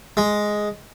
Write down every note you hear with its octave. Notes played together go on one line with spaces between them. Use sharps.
G#3